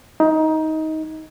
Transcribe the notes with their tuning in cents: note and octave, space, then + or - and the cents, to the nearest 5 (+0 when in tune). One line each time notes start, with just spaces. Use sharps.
D#4 +20